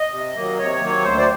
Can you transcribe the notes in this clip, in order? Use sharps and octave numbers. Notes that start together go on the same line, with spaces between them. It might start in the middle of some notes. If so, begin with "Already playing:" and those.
Already playing: D#5
C3
D#3 F#3 A#3
C3 C#5
D#3 F#3 A#3
D2 C5
D5